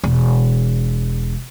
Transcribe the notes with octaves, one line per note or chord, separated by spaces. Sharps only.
E1